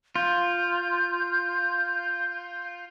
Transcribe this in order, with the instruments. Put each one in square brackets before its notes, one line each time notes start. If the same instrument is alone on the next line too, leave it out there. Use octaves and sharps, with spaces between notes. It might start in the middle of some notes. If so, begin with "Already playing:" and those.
[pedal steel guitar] F4 [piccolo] G6